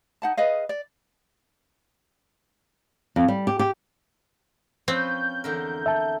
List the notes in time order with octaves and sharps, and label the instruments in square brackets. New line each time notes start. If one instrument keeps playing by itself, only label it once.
[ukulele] D#4 F#5 A5
G#4 B4 D#5 F5
D5
[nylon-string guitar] F2
G3
G4
G4
[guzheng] F3 C#4 B4 [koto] C4 [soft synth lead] G6
[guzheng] E2 D3 A#4
[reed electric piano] E5 A5